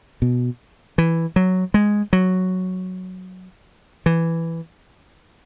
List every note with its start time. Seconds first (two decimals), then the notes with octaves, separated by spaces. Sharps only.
0.22 B2
0.98 E3
1.36 F#3
1.74 G#3
2.13 F#3
4.06 E3